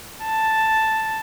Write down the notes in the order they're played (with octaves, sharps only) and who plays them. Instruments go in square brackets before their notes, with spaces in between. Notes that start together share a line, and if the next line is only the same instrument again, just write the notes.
[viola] A5